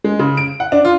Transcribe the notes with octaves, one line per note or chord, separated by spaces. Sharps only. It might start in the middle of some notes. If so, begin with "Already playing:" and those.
G#3
C#3
D7
F#5
D4
F4